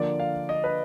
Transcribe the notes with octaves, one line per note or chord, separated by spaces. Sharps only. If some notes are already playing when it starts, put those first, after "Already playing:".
Already playing: D3 F3 A#3 D5
F5
D#5
B4